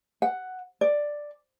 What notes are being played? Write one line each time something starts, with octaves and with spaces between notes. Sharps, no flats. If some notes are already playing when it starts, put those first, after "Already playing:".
F#5
D5